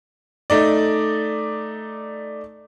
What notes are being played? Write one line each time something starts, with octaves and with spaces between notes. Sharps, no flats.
A3 D#4 D5